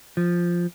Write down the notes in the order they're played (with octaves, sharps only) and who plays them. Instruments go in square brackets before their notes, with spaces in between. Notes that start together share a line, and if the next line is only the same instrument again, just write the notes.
[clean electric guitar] F3